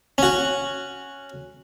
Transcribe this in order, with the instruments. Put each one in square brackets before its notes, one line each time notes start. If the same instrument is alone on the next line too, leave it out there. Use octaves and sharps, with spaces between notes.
[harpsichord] C#4 F#4